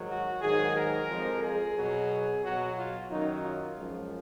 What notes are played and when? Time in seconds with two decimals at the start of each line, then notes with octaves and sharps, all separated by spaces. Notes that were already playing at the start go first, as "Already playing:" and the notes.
Already playing: G#2 D#3 F#3
0.08 F#4
0.41 G#2 D#3 F#3 G#4
0.75 A#4
1.09 F2 F3 G#3
1.42 G#4
1.76 B2 F#3
2.43 B2 F#3 F#4
2.76 F4
3.10 F#2 D#3 F#3 D#4
3.43 F4
3.77 F#2 F3 G#3